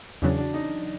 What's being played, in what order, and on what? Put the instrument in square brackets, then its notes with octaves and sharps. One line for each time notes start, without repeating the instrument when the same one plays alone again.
[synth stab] E2 C#3 F#3 [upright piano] D4
[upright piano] D4
D#4